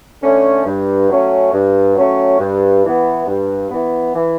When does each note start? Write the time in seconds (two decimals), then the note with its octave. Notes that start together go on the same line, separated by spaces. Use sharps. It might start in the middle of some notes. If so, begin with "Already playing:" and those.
0.21 D3 A3 C#4
0.65 G2
1.09 F#3 A3 C#4
1.52 G2
1.96 F#3 A3 C#4
2.39 G2
2.83 E3 B3
3.26 G2
3.70 E3 B3
4.14 E3